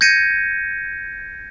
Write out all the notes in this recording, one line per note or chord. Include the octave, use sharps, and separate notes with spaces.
G6 G#6 A#6 C#7 D#7